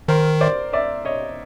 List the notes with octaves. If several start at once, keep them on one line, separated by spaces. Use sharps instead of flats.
D#3 A#4 C5
C5 D5
D5 E5
C#5 D#5